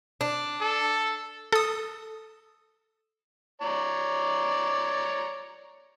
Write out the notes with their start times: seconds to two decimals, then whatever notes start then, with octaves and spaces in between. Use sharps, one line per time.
0.21 D4
0.61 A4
1.52 A4 D#6
3.61 C#5 D5 A#5